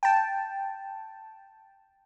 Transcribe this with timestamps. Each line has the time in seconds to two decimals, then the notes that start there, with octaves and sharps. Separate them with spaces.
0.03 G5 A5